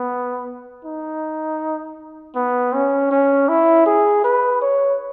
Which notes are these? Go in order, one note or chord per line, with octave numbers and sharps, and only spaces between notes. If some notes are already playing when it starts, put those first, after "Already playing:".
Already playing: B3
D#4
B3
C#4
C#4
E4
G#4
B4
C#5